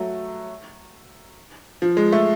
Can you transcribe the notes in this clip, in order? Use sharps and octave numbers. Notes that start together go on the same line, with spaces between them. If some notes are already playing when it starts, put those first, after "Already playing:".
Already playing: F#3 A3
F3
G#3
A3